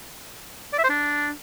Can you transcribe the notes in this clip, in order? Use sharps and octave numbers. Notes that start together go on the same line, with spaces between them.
D5
E5
C5
D4